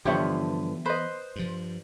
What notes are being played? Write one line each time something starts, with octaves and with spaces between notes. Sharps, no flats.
G2 D3 E3 F3 B3 G4 C#5 E5
B4 C5 D#5
G2 F3